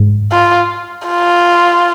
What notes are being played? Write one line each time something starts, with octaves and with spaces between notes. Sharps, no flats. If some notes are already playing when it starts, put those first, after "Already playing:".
Already playing: G#2
F4
F4